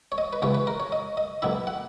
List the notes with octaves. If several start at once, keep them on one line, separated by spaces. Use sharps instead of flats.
C#5
D#5
B4
C#2 C#3 E3 C#5
B4
A#4
C#5
D#5
D#5
B1 B2 A#3 E4 E5
F#5